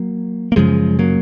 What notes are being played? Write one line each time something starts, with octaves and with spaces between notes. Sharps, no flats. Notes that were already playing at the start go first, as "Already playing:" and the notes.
Already playing: F#3 A#3
A#3
F#2 C#3 F3 G#3
F#3 A#3